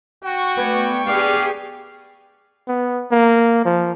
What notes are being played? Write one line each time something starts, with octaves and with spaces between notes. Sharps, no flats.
F#4 G5 C#6
A3 B3 B4 D5 G#5
B3 D4 G4 G#4 D5 F5
B3
A#3
F3